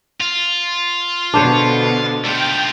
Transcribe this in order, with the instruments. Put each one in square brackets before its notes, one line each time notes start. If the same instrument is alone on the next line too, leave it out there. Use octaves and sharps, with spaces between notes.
[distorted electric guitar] F4
[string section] B2 D3 [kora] D4 C5 C#5
[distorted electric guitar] A3 F4 [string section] G5